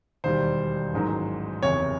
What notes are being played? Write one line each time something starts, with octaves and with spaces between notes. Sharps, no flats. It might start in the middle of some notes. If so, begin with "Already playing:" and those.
E1 D#2 D#3 G3 C5
A1 G#2 D#3 F#3
F#1 E2 C3 C#5